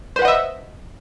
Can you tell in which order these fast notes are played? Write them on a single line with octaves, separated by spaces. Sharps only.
C5 B4 F#5 D#5 E5